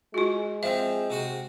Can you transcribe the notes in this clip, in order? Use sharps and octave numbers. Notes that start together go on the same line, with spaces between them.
G#3 F4 F#4
F3 C4 E5
C3 F#4 C6